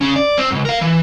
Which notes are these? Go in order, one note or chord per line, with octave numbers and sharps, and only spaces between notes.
C#3 C#4
D5
C4
C#2 F#2
A#4 F5
E3